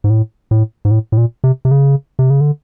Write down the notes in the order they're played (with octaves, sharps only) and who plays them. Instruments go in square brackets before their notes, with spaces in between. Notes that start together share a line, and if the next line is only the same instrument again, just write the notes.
[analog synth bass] G#2
A2
A2
G#2
A2
A2
A#2
C3
C3
C#3
C3
C#3
D3